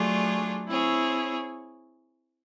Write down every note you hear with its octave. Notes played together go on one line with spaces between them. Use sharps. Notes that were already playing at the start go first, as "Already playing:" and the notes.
Already playing: F#3 A3 D4 F4 G#4
C4 E4 G#4 C#5